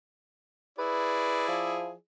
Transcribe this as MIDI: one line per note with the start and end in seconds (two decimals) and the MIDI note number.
0.79 1.94 64
0.79 1.94 68
0.79 1.47 71
0.79 1.94 74
1.48 1.92 53